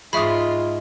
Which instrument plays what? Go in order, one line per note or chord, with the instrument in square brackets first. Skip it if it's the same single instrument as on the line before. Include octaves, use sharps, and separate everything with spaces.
[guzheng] G#2 G#3 [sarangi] F4 [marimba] G#4 C#6 D#6 [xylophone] E5 B5